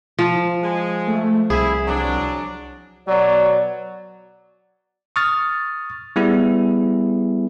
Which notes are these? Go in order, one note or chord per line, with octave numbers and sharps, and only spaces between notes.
F3
G#3
A3
C2 E4 G#4
F#3 D4
B2 F#3 D5
C#6 D#6 F6 A6
G3 B3 E4 G#4